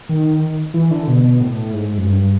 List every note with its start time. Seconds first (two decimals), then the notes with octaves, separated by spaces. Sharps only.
0.09 D#3
0.74 E3
0.91 D3
1.08 B2
1.24 B2
1.41 A2
1.74 G#2
1.98 F#2
2.06 G2